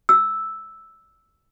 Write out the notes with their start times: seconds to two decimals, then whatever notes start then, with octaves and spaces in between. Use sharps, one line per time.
0.09 E6